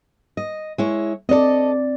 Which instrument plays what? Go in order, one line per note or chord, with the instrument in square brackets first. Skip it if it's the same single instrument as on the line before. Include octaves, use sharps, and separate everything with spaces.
[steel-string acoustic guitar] D#5
G#3 E4 C#5
[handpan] C4 D5 [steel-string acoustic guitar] A4 D#5